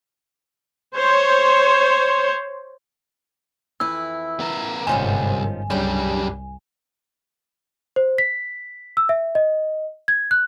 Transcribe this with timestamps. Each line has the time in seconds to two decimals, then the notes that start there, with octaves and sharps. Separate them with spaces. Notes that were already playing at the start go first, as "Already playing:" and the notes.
0.94 C5 C#5
3.80 F2 E3 E4 E6
4.40 B3 A#4
4.87 G1 C2 G#2 D#3 F3 C#4 G#5
5.70 C2 F#2 C#3 G3 D4 G4
7.96 C5
8.18 B6
8.97 E6
9.09 E5
9.35 D#5
10.08 G#6
10.31 F#6